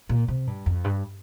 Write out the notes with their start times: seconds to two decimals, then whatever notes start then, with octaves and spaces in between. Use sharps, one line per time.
0.09 A#2
0.28 C3
0.47 G2
0.66 F2
0.84 G2